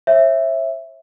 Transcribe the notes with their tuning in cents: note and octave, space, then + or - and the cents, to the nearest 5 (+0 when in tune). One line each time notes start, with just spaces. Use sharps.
C#5 -45 E5 +0